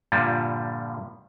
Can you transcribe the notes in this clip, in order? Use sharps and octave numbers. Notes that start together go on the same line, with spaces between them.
G2 A#2 D3 F3 G3